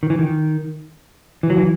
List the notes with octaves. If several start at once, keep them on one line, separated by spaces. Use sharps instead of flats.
D#3
E3
D#3
E3
F#3
E3